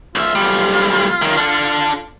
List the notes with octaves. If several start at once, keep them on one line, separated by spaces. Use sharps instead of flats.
B1 F4 E5
B1 G3
F#2 D#3
D4 A4